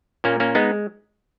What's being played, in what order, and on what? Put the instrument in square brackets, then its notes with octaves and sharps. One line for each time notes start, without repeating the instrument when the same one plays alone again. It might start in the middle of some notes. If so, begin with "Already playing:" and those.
[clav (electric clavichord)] A#2 A#3 C#4
A#3 C#4
G#3 B3 D#4